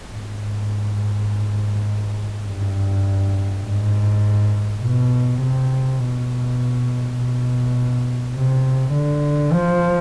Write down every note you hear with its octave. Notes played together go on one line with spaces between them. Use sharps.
G#2
G2
G#2
B2
C3
B2
B2
C3
D3
F3